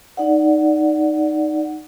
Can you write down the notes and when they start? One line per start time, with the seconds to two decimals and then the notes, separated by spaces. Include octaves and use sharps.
0.17 D#4 D5 F#5